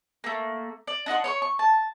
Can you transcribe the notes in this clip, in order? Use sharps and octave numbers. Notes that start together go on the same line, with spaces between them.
A3 A#3
D5
D4 D#4 F#5 C6
C#5 C6 C#6
C#6
A5